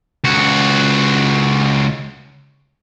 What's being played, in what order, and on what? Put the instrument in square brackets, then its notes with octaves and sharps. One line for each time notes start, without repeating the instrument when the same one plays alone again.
[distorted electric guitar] C#2 F#4